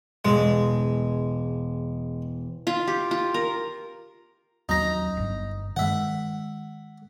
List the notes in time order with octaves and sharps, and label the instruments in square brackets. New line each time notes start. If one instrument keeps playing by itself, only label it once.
[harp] E1 [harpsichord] G#3
[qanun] F4
G4
F4
A#4
[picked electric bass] D#2 F#3 C#4 [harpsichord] D#4 A#5
[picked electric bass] G1 G2
[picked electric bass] D#3 G#3 [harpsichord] E5 F#5